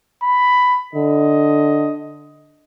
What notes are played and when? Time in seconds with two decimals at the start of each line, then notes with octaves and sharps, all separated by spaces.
0.23 B5
0.95 D3 D#5